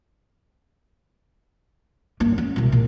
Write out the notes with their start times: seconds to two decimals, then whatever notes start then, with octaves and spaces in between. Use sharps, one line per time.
2.20 G2 A#3
2.38 C#4
2.56 C2 B2
2.72 A#2